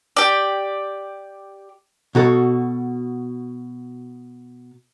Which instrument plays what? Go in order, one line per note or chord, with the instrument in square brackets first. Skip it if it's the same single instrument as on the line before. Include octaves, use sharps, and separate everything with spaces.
[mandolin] G4 D5
[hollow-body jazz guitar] B2 F#4 A4